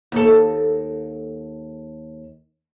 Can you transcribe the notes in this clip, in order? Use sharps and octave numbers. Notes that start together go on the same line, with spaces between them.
D#2 A4